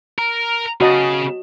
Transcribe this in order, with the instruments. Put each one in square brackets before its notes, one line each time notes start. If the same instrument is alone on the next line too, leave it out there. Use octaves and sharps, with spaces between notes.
[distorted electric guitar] A#4
[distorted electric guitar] C#3 G#4 [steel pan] F#4 D#5 A5